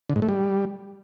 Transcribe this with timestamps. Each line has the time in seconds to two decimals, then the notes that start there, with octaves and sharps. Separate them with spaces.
0.10 D3
0.16 G#2
0.22 A3
0.29 G3